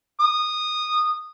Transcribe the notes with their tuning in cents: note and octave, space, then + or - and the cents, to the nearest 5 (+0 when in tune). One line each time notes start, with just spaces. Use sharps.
D#6 -15